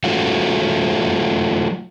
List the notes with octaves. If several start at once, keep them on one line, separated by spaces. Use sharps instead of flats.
F#3 A3 F4 F#4